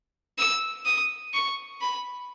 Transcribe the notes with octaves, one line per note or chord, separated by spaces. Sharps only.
E6
D#6
C#6
B5